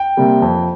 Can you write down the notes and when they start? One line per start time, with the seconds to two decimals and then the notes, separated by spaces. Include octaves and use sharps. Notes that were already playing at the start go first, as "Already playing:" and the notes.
Already playing: G5
0.17 C3 G3 A#3
0.42 F2